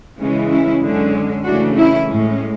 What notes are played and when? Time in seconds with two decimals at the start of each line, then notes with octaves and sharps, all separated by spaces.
0.18 C#3 E3 G#3 C#4
0.50 C#4 E4
0.81 F#2 D3 G#3 C#4
1.44 C#3 E3 A3 C#4 D4 F#4
1.75 C#4 E4
2.07 A2 G#3 C#4